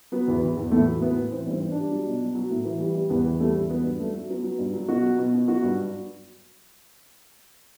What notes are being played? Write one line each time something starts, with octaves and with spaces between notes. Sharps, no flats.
F#3 B3
E2
E2
E2
A2 A3
F#3
A2 B3
A2
E3 C4
G2 C4
G2
D4
G3
F#3
B2
F#3
F#3
A2
E3
G3
G3
E2 B3
E2
G3 A3
E2
F#3 B3
G2
F#3 A3
F#3
F#3 B3
F#3
G2
F#3
B2 F#4
F#3
B2
B2
F#3 F#4
G2
F#3